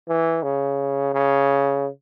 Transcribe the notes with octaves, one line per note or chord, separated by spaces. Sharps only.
E3
C#3
C#3